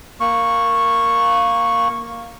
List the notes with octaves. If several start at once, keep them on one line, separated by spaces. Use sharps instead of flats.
A#3 C#6